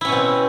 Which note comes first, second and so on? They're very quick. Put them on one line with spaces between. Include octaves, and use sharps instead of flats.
E4 C#4 B2 C4